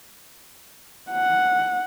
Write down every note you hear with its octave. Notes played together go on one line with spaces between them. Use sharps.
F#5